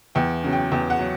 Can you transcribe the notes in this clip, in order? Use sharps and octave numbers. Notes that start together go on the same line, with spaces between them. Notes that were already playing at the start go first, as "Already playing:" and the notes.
E2 G5
C#3 F#3
G5
E2 G5
F#5
F#3